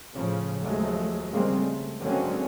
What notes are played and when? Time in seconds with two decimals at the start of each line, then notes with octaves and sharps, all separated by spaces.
0.13 A2 C#3 F3
0.61 D#2 F3 F#3 G#3 A3
1.32 C#3 G3 G#3 A#3 C4
1.64 A3
2.01 D3 F#3 G#3 A#3 C4 C#4